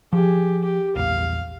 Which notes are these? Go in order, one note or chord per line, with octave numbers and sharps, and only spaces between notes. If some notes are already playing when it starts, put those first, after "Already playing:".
F3 G4 G#4
G4
A#1 E2 F5